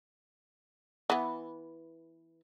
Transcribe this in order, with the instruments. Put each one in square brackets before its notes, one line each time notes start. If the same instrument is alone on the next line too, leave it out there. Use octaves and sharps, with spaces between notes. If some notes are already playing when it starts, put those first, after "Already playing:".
[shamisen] E3 B3